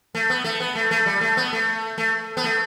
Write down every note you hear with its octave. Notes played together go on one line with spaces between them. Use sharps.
A3
B3
A3
B3
A3
A3
G3
A3
B3
A3
A3
B3
A3